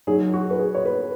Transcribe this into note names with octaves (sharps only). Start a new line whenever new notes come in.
F#3 D#4 G#4
F#4
B4
G#4
C#5
B4